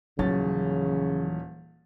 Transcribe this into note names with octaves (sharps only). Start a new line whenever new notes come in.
D#1 C#3 E3 F#3 C#4 A6